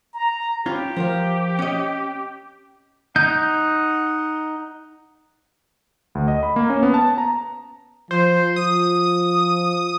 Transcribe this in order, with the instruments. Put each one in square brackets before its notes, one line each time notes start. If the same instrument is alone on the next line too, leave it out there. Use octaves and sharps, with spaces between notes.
[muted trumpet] A#5
[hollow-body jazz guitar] C#4 F4 B4 [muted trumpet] G4
[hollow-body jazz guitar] F3 A#4 F5
C#4 D#5
[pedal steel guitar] D#4 G6 [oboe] F#5
[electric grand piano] D2
D#5
B5
A#3
C#4
B3
A5
A#5
[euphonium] F3 [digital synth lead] C5
[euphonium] F3 [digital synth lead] D#6